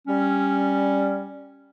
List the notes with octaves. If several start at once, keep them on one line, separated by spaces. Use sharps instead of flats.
G3 C#4